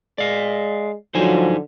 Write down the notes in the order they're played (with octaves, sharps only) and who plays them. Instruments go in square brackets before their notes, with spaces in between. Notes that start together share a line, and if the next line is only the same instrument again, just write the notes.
[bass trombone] G#3 [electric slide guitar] D5 F5
[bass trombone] D3 [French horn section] F3 F#3 [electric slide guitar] D#4 C5 G#5